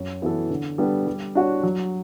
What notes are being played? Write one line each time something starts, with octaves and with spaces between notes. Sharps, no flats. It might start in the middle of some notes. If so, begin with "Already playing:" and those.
Already playing: F#2
E3 B3 F#4 A4
D3
G3 B3 D4 A4
G3
D4 F#4 C#5
F#3